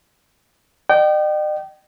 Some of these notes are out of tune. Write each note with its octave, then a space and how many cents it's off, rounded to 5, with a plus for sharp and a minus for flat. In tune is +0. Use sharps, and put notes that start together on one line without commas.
D#5 -45 G5 -25